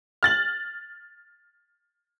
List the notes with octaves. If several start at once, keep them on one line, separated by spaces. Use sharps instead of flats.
F6 A6 F#7